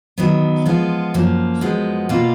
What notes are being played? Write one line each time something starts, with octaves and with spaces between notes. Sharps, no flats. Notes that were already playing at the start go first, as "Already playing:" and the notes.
D#3 F#3 B3
F3 G#3 B3 F4
F#2 F3 A#3
F#2 F3 G#3 B3
B2 A#3 F4